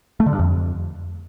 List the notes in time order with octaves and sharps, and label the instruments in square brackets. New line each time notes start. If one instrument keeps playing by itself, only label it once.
[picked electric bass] A3
D3
G2
F2